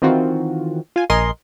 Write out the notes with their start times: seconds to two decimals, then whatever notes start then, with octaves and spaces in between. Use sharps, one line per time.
0.02 D#3 E3 C4 F4 F#4
0.96 F4 G#5
1.10 A#1 A#4 D#5 G#5 C6